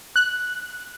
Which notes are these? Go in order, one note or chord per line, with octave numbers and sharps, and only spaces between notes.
F#6